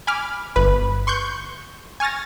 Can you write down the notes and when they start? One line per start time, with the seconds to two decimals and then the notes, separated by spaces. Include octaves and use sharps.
0.07 G#5 B5 D6 F6
0.56 G1 B4 B5
1.07 C6 C#6 F#6 G6
2.00 G#5 C#6 F6 A6 A#6